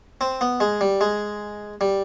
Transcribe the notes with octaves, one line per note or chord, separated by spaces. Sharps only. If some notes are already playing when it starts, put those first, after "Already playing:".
C4
B3
G#3
G3
G#3
G3